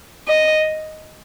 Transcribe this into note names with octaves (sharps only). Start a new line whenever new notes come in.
D#5